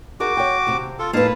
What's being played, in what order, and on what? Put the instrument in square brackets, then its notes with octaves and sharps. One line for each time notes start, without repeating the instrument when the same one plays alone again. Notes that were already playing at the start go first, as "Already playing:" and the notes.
[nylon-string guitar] D#4 G#4 A#4 [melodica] F#4 D6
[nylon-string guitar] C#5 G5
D#2 C3 C4
[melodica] F4 A4
[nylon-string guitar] F2 A2 D#4 [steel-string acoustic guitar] A#3 B4 [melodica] F5 A5